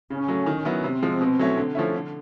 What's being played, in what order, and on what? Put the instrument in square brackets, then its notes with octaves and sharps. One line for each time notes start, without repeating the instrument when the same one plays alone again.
[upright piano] C#3 [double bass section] C#4
[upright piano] F#3 A3
D#3
F#3 B3 E4
[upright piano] C3 [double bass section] C4
[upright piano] F3 G#3
B2
F#3 A3 C#4 E4
D3
F3 A3 C#4 E4
D3